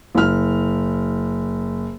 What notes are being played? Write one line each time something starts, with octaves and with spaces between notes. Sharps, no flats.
F#1 F6